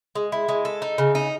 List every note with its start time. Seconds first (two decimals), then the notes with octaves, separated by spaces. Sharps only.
0.15 G#3
0.32 E4
0.49 G#3
0.65 A4
0.82 D#4
0.98 C#3
1.15 D#4